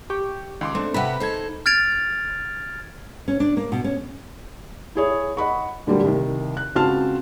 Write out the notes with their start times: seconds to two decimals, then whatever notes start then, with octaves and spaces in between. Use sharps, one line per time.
0.10 G4 C#6 D6
0.61 C#2 D#3 C6 D6
0.75 A3 C4 D4
0.94 C3 G4 B4 E5 F#5 B5
1.20 D#4 A4 C5 G#6
1.66 F6 G#6 A6 D7 F7
3.28 C#4
3.40 D4
3.57 A#3
3.72 B2
3.84 C#4
4.95 E4 G#4 C#5
5.37 D#5 F#5 B5 C#6
5.87 A#2 D3 F#3 G3 A#3
6.03 C2 D#3
6.57 F#6
6.75 C#2 C4 F#4 A5 C6 F6